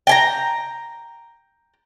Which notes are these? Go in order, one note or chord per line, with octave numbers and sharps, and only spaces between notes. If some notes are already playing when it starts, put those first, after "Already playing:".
G5 G#5 A#5